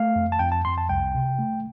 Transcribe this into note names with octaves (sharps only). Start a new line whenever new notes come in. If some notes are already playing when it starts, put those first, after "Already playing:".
Already playing: A3 F5
F2
A5
F2 G5
A5
F2 C6
A5
C2 G5
C3
A3